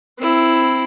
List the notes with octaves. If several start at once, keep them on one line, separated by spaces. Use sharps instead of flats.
C4 E4